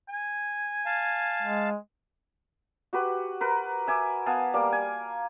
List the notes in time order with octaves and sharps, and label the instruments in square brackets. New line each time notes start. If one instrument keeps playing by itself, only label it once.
[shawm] G#5
[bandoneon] F5 A5
[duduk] G#3
[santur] F#4 G4 B4
A#4 B4
E5 G#5 D6
B3 F5 G#5 A5
G3 A#3 D6
G#5